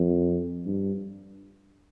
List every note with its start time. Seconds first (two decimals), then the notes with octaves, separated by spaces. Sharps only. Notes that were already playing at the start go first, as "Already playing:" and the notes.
Already playing: F2
0.66 G2